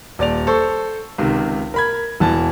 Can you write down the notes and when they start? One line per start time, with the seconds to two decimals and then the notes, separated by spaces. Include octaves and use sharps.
0.19 D#1 D5 F7
0.47 A4 C5 C#6 E6
1.18 C#2 C3 D#3
1.74 A#4 B5 G#6
2.20 E1 E3 A5